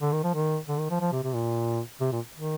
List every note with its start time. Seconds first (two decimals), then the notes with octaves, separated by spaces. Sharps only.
0.01 D3
0.12 D#3
0.23 F3
0.35 D#3
0.68 D3
0.79 D#3
0.90 F3
1.01 F3
1.12 C3
1.23 C3
1.34 A#2
2.01 C3
2.12 A#2
2.35 D#3